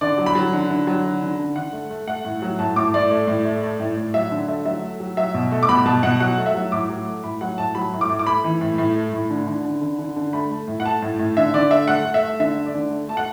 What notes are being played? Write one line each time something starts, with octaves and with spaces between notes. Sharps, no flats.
D3 D5
F#3
B5
F#3
D3
D3
F#3
D3
D3
D3
D3 F#5
A3
A3
A3 F#5
A2
F#3
A2 A5
A2 D6
A2 D5
A3
A2
A3
A3
A2
A2
F#3 E5
D3
A3 E5
F#3 E5
A3
F#3
F#3 E5
B2
A3
D6
B2 B5
B2 A5
B2 F#5
F#3 F#5
A3
E5
F#3
A2 D6
F#3
A3
A2 B5
F#3 F#5
A2 A5
F#3 B5
A2
D6
A2
D6
A3 B5
E3
A2
A2
A3
A2
D3
D3
D3
D3
D3
D3
A3 B5
A3
A2
F#5
A3 A5
A2
A2
D3 E5
D3 D5
A3 E5
A3 F#5
A3
E5
A3
D3 E5
A3
D5
D3
A3
A3 A5
F#5